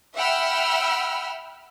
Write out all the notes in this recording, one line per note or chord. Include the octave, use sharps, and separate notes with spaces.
E5 F#5 G5 B5 E6 F6